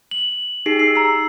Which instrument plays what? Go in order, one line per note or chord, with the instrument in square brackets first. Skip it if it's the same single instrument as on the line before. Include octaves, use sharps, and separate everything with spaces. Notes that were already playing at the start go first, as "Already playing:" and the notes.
[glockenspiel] F#7
[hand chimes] D#4 G4 G#4 [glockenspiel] C7
[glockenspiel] E6 C7
A#5 E6